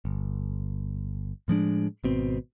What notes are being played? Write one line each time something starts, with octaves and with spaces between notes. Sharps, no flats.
G1
A2 F3 G#3 D4
G#1 B2 C4